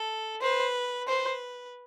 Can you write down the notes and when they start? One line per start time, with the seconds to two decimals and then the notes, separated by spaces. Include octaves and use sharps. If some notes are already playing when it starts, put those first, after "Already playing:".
Already playing: A4
0.42 B4 C5
1.08 B4 C5